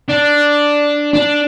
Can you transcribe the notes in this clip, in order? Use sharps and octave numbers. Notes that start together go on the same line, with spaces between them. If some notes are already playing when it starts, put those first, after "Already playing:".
D4
D4